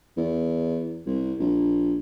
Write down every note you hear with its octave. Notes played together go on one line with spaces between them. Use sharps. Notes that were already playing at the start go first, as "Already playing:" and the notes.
E2
C2
A#1